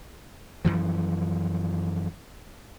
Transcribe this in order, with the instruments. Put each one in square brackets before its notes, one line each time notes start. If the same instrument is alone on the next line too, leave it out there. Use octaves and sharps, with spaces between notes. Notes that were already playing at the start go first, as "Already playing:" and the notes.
[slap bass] F#2 C#3 E3 F3